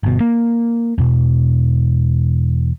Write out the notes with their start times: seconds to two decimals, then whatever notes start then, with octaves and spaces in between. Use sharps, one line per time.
0.03 G1 B2
0.20 A#3
0.98 E2 B2